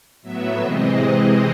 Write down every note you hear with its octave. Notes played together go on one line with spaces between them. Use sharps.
A2 F#3 B3 E5
C3 E3 G#3 C4 D#5